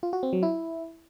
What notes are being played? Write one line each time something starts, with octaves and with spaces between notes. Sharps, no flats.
F4
F#4
C4
F#3
E4